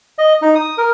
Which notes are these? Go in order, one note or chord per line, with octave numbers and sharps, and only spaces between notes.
D#5
D#4
D#6
A#4